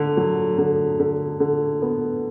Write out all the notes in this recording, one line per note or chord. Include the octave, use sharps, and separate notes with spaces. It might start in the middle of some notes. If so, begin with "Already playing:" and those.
Already playing: D3
F#3
D3
D3
D3
B3